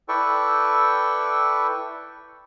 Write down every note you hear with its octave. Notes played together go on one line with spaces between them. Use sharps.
E4 A4 B4 D5 G5 C#6